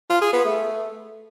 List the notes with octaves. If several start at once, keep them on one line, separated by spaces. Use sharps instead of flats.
F4
G#4
B3
A3